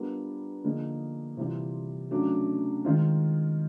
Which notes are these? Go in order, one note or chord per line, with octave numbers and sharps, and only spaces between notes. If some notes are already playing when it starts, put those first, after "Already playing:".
Already playing: G3 B3 D4 F4 A#4
D3 F3 A#3 D#4 G#4
C3 E3 G3 C4 F4
C#3 F#3 A3 D4
D#3 G#3 C4 F4